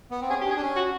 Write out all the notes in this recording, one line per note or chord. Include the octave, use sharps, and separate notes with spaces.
B3
C4
C#4 G#4
G4
D4
G#4
D4
C#4
F#4